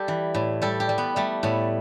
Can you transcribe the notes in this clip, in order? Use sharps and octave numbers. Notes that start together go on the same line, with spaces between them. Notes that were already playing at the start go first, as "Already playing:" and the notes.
Already playing: G3 G4 A4
E3
A2
G3 A4
G4
G3
B3
G3 A3
A2 B3